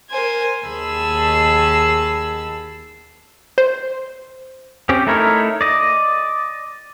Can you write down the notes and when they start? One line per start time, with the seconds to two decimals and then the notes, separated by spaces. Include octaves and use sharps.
0.10 A#4 C5 G#5
0.67 D#2 D#3 G#4 A5 B5 E6
3.58 C5
4.89 C4 C#4 G4
5.07 A3 D#4 E4 A#4 C#5
5.61 D5 D#5